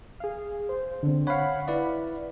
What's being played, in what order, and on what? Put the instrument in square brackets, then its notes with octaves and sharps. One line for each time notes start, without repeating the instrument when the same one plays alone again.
[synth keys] G#4 F5
C5
D3 C4
[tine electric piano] C#5 F5 [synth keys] F#5 B5
[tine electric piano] E4 B4 D5